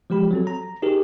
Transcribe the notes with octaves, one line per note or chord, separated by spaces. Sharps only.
F3 G#3 G4 B5
F#3 C4 A4
A#5
D#4 G4 G#4 A#4